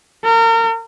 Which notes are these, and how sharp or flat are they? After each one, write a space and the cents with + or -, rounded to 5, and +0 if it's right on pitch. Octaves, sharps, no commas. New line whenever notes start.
A#4 -35